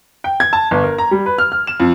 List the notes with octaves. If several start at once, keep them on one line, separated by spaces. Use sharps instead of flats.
G5
G#6
A5
G1
A#4
A#5
G3
B4
F6
F6
E7
F2